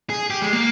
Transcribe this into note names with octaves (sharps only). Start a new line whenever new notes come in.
G#4
G4
G#3
A#3